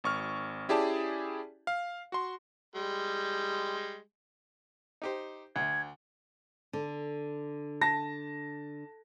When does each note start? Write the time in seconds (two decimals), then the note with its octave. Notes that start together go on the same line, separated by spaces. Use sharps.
0.04 G#1 C#6 F6
0.69 C#4 E4 G4 G#4 D5 A5
1.67 F5
2.12 F#4 C6
2.75 G3 G#3
5.02 D#4 G4 C5
5.56 D2 G#6
6.73 D3
7.82 A5 A#6